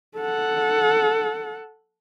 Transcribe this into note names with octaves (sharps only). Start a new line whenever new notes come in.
A4 F#5